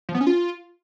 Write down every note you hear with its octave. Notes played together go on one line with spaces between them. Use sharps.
F3
B3
C#4
F4